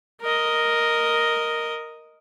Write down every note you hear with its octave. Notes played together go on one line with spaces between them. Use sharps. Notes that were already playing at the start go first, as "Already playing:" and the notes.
A#4 D#5